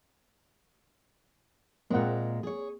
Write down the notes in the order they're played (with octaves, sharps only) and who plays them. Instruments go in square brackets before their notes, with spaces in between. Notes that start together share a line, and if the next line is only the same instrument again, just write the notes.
[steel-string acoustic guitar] A#2 G#3 [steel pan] A#3 C4 F#5
[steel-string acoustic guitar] G#4 C#5